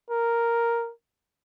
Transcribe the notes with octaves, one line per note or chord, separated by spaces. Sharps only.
A#4